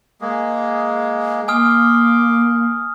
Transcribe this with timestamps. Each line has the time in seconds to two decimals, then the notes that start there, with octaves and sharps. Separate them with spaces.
0.21 G#3 A#3 G#4
1.48 A#3 G#5 C6 D6 D#6 F6